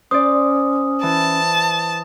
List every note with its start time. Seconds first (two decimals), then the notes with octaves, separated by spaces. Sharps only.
0.11 C#4 C5 D5 D#6
1.03 E3 A5